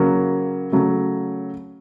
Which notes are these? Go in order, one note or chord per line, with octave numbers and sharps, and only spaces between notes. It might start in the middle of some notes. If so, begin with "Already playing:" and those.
Already playing: C#3 F#3 A#3
C#3 F#3 A3